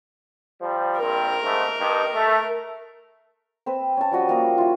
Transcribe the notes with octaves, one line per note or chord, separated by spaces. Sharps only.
F3 G3
A#1 G2 C4 A#4
G#2 C#3 A3
G2 D#4
A3
C4 B4 E6
C#4 A5
F3 G3 F#4 D#5
A#3 A#4 D#6
E4 F4